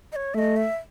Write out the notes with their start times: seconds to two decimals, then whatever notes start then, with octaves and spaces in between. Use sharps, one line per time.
0.12 D#5
0.16 C#5
0.34 A3 D#5 E5
0.56 E5